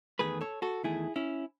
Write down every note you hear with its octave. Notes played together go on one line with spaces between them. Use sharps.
E2 D#3 A3 G#4 B4
A4 C#5
F#4 A4
E2 D#3 A3 E4 G#4
C#4 E4